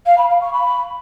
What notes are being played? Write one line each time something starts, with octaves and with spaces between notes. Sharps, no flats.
F5
B5
F5
C#6
B5